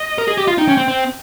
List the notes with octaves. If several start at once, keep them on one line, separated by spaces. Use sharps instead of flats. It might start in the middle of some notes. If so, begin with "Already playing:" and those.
Already playing: D#5
A#4
G#4
G4
F4
D#4 G5
C#4
C4
C4